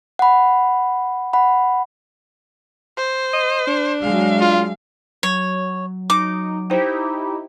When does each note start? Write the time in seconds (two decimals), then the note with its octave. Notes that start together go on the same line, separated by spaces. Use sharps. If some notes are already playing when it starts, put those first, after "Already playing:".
0.19 F#5 B5
1.33 F#5 B5
2.97 C5
3.33 D#5
3.67 D4
4.03 F#3 G#3 F5
4.41 F4
5.23 F#3 C#5
6.10 D#4 D6
6.70 D#4 E4 G4 C5 G5